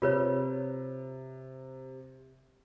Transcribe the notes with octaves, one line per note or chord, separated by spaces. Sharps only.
C3 F4 B4 C#5